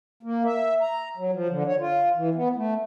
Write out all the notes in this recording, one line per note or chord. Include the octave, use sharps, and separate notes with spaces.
A#3
E5
A#5
F#3
F3
D3
C#5
F4
E3
B3
A3